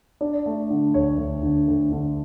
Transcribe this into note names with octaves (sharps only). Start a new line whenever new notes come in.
D4 D5
A3
D3
D2 C#5
D2
D3
D2
D3